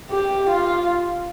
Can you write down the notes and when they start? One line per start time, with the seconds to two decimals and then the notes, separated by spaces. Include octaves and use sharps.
0.10 G4
0.49 F4